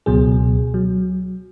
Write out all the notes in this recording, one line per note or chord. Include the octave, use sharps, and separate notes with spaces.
C#2 B2 F#3 G#4
F#3